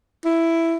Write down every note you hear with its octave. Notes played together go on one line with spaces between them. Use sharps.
E4